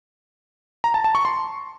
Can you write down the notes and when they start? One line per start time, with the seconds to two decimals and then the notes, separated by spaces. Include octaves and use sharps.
0.84 A#5
0.94 A5
1.04 A5
1.15 C#6
1.25 C6